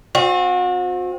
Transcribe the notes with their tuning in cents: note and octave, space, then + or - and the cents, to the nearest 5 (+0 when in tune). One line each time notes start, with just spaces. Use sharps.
C4 +0 F#4 -40